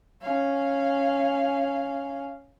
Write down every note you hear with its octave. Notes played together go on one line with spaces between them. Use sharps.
C#4 F5